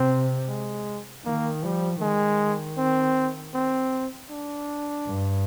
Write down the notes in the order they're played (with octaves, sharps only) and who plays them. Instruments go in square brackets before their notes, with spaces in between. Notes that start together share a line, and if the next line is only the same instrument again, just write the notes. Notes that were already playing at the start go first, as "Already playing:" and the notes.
Already playing: [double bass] C3 [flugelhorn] C4
[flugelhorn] G#3
[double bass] D#3 [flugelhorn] A#3
[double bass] F3 [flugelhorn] G3
[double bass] D#3 [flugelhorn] G#3
[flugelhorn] C4
C4
D4
[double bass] G2